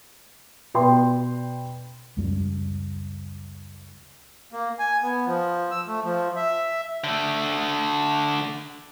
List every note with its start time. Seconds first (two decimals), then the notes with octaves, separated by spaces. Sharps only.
0.74 B2 B4 D5 G5 C6
2.17 C#2 F#2 G3
4.53 A#3
4.79 G#5
5.03 B3
5.26 F3
5.71 E6
5.87 A3
6.03 F3
6.36 E5
7.04 D3 A3